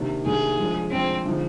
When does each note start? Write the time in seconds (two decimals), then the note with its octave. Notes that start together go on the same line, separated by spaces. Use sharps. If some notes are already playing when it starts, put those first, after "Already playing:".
Already playing: C3 D#3 A#3 D4
0.25 C3 D#3 A#3 D4 G#4
0.59 F3 G#3 D4
0.91 F3 G#3 C4 D4
1.25 D3 F3 G#3 D#4